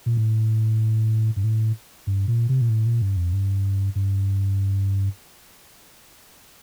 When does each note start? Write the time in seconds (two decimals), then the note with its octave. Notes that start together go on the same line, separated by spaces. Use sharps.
0.06 A#2
0.17 A2
1.36 G2
1.44 A2
2.07 G2
2.28 A#2
2.49 C3
2.61 A#2
2.69 A2
2.86 A#2
3.02 G2
3.17 F2
3.33 G2
3.95 G2